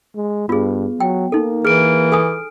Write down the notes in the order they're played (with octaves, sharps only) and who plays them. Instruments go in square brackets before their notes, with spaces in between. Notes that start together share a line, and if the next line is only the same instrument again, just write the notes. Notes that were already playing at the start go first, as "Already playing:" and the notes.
[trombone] G#3
[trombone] G2 [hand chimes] B3 [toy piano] F4 G#4
[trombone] F#3 [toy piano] G5
[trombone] A#3 [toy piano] D#4 A4
[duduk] E3 [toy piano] G#4 [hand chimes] F6 D7
[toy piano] A4 G#5 D#6